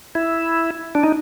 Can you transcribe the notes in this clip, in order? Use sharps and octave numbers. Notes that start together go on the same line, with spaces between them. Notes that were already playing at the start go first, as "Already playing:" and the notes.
E4
D4
D#4